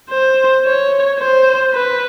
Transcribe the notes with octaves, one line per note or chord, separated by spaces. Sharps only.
C5
C#5
C5
B4